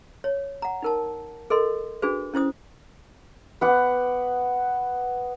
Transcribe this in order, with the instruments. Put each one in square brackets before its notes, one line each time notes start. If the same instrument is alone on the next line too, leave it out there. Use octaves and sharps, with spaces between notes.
[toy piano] C#5
F#5 A#5
D#4 A#4 A5
A4 A#4 D#5 C6
D4 F#4 G#4 B4
C#4 E4 C5 D#6
[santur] B3 F#5 D6